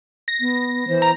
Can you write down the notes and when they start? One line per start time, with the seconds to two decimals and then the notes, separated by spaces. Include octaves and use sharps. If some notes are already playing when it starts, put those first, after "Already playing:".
0.28 A#6
0.40 B3
0.88 E3 C5
1.02 A#5